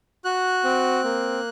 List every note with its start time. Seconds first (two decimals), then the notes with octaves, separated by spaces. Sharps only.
0.25 F#4 F#6
0.64 C4
1.04 A#3